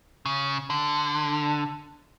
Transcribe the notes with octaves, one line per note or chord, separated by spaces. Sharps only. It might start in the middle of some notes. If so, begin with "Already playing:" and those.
C#3
D3